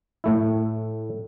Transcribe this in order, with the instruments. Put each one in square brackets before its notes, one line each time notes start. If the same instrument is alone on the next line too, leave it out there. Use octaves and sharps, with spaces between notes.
[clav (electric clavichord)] A2 A3 E4